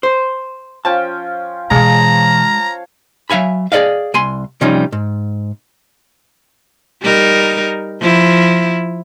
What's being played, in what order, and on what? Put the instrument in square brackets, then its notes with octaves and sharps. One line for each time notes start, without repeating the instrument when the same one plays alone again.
[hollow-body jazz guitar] C5
[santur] F3 C#4 G5 [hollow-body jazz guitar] A5
[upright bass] B2 E3 [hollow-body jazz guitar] G#3 [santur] C#5 F5 A5 [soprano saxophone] A#5
[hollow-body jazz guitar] F#3 E5 F5 G#5 B5
G#4 A4 D5 D#5 F5
C2 G#5 C6
C3 F3 G3 C#4 D#4
G#2
[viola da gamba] G3 D#4 A#4
F3 E4